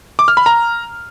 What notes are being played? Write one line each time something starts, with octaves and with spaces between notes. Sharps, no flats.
D6
F6
B5
A#5